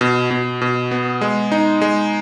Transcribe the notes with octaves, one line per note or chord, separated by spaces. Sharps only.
B2
B2
B2
B3
G#3
D#4
G#3